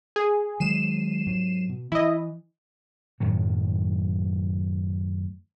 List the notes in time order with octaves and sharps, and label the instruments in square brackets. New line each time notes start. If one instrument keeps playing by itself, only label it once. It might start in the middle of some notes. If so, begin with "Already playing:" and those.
[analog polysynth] G#4
[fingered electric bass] D#3 F#3 G#3 [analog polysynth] C7 D#7 E7
[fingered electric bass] G#2 F#3
B2
[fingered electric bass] E3 [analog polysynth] E4 D#5
[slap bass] F#2 A2 D#3 F#3